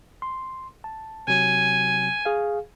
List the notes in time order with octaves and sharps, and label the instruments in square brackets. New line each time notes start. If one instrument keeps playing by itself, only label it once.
[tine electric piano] C6
A5
[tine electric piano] C3 F#3 [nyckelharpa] G#5
[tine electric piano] G#4 F5